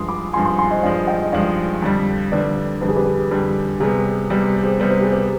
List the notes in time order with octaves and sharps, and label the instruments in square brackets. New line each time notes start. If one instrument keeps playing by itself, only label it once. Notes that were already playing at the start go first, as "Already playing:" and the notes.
Already playing: [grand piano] G2 F3 G#3 [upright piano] C6 D#6
[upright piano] B5 D6
[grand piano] G2 F3 G#3 [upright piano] G#5 C6
[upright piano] G#5 C6
G#5 C6
C5 D#5
[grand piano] G2 F3 G#3 [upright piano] D5 F5
[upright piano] D#5 G5
D#5
[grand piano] G2 F3 G#3 [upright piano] D5 F5
[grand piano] F2 D3 G3
[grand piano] F2 D3 G3 [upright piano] B4 D5
[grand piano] F2 D3 G3 [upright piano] B4
[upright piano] G#4
G4 B4
[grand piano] F2 D3 G3
[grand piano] C3 G3 B3 [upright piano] G#4
[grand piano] C3 G3 B3 [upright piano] G4
[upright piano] G#4 C5
[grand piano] C3 G3 B3 [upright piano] C5
[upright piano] B4
G#4
G4 B4